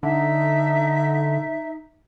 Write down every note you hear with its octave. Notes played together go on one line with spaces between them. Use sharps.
D3 D#4 E5